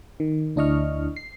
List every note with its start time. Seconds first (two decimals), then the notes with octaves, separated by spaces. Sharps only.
0.20 D#3
0.56 D2 D4 E4 D#5 C#6 F6
1.16 C7